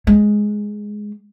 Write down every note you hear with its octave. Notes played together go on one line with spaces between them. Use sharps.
G#3